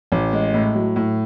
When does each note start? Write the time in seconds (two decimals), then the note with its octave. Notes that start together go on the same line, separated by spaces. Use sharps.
0.12 A1
0.33 G#3
0.54 A2
0.75 F#3
0.96 A2